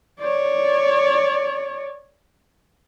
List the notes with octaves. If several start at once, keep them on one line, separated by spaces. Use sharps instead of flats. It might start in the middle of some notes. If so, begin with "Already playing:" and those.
C#5 D5